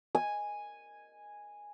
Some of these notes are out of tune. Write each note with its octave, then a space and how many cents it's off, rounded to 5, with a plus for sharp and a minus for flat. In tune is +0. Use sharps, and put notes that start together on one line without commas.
G#5 -5